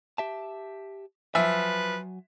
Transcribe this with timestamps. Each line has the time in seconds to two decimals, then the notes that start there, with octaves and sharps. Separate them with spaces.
0.18 G4 E5 A5
1.35 F3 F#3 B4 E5 G#5